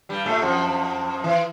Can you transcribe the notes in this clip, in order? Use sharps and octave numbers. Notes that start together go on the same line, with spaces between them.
G2 G3
A2 A3
F2 F3
E3